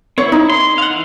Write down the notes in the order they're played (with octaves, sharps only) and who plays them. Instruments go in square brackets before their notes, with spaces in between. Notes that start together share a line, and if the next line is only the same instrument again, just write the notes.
[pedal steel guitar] C4 E4 [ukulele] C#5
[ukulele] D#4
[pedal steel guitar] C6
F5 F#5
E3